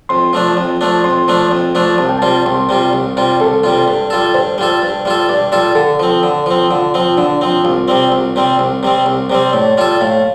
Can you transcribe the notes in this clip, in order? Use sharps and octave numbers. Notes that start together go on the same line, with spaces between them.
F2 C6
F3 A3 D4
F2
F3 A3 D4
F2 C6
F3 A3 D4
F2
F3 A3 D4
C2 A5
G5
C3 G3 F4 A5
C2 C6
C3 G3 F4
C2
C3 G3 F4
C2 A4
C3 G3 F4
G2
G3 F4 A4
G2 C5
G3 F4 A4
G2
G3 F4 A4
G2 D5
G3 F4 A4
D3 A4
F3 C4
D3
F3 C4
D3 F4
F3 C4
D3 D4
F3 C4
C2 F4
C3 G3 C4
C2
C3 G3 C4
C2
C3 G3 C4
C2
C3 G3 C4
A2 D5
G3 F4 A4
A2 F5